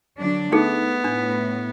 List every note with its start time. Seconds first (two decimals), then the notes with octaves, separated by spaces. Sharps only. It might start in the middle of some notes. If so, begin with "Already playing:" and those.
0.18 D3 F#3 D4
0.52 A3 B3 D#4 G#4 A4
1.04 A2 D4